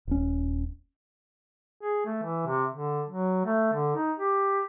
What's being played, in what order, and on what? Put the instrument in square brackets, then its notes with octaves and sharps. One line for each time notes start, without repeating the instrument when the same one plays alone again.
[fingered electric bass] D#1 C#4
[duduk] G#4
A3
E3
C3
D3
F#3
A3
D3
D#4
G4